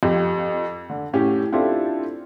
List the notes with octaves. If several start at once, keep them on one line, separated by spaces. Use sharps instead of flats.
F2 G4
D3
A2 C#4 G4
C4 D4 E4 F4 G4 A4